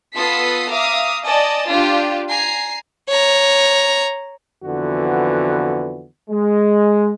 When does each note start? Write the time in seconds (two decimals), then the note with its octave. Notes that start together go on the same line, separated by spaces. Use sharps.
0.16 B3 F4 A4 D#6 B6 C7
0.72 E5 F5 A#5 D6 D#6
1.24 D5 D#5 G#5 A5
1.69 D4 F4 G4
2.29 G#5 A#5 C7
3.09 C#5 A#5
4.64 F2 D3 E3 B3 F#4
6.30 G#3